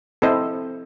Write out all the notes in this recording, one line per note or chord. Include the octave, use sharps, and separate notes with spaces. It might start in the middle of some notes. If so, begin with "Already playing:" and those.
C4 E4 A4 C5 D#5